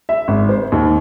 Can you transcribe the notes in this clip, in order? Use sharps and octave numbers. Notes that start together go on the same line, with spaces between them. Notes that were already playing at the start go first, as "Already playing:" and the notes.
E5
G#1
C5
D#2